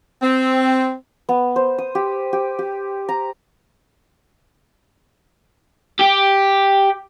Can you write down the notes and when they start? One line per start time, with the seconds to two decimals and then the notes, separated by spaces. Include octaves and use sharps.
0.22 C4
1.29 B3
1.56 C5
1.78 D#6
1.95 G4
2.33 G4
2.59 G4
3.09 A#5
6.01 G4